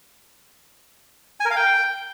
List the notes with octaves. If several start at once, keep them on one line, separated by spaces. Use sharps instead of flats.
G#5
A#4
F5
G5